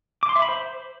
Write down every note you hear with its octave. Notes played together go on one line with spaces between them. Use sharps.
D6
C6
E5
B5
C5